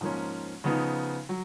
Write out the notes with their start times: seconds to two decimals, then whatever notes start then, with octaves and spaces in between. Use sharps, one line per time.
0.01 G#2 F3 A#3 C#4
0.64 C#3 F3 B3 D#4
1.29 F#3